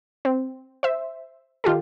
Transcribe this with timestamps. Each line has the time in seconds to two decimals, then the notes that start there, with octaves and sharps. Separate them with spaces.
0.25 C4
0.83 C5 E5
1.64 D#3 F4 G4 A4